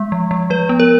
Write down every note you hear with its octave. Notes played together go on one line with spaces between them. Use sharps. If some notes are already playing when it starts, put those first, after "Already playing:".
Already playing: G#3
F3
F3
F3 B4
B3
A#4